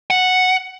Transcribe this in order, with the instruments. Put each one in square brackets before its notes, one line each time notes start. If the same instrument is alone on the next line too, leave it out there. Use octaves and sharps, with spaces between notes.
[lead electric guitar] F#5